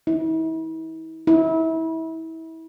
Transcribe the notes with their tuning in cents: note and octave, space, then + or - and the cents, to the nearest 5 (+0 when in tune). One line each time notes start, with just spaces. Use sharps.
E4 -40
E4 -30